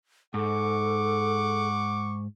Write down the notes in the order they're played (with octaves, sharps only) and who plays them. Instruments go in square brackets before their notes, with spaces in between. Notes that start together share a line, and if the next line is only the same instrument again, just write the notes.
[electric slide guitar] G#2 [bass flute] A4 [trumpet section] F#5 C#6 D6